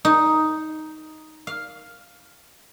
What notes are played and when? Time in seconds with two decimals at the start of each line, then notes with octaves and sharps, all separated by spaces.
0.05 D#4
1.47 F5